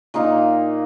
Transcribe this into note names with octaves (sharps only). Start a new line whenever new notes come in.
A#2 A#3 D#4 F5